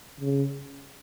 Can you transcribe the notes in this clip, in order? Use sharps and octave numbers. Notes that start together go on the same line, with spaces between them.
C#3